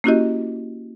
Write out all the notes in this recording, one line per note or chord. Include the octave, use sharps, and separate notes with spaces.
A#3 C#4 E4 F#4 G4 D#5